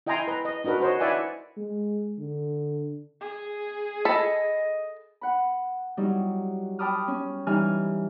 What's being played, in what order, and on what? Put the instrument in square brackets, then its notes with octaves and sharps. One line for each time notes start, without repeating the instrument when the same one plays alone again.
[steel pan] E4 D#5 G5 G#5 A#5 C6
B4 A#5
D#5
D4 D#4 F#4 A#4 B4
F#4 C5 C#5 D#5
E4 B4 D5 E5 F#5 G#5
[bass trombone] G#3
D3
[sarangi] G#4
[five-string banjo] A4 B5 [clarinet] D#5
[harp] F#5 B5
F#3 G3 D#4 E4
G5 A5 B5 D6 D#6 F6
C#4
E3 G3 D#4 G#5 F6